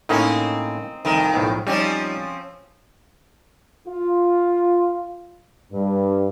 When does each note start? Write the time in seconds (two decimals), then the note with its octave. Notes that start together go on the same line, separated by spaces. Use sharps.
0.09 A2 A#3 C4 C#4 D#4
1.05 C2 F2 D#3 A#4
1.34 B1 A2 F3
1.67 F3 G3 C4 C#4 D#4
3.88 F4
5.72 G2